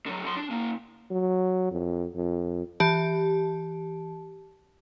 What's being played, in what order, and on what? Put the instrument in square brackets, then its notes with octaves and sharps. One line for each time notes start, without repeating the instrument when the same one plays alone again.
[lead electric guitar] D3 F#3
F#3 C6
D4
C#3 A#3
[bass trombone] F#3
F2
F2
[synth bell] E3 G4 A5